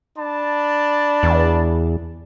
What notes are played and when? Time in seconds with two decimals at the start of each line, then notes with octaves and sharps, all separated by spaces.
0.18 D4 A5 B5
1.23 E2